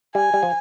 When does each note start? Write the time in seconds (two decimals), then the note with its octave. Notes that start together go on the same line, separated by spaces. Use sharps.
0.15 G3 G#5
0.34 G3
0.43 F3